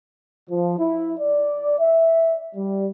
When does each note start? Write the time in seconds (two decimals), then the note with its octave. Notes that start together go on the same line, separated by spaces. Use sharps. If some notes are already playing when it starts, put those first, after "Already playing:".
0.47 F3
0.77 E4
1.19 D5
1.78 E5
2.55 G3